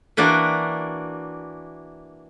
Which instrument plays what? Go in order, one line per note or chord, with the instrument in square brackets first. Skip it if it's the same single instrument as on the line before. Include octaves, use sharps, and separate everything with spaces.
[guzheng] E3 A#3 D4 F#4 D5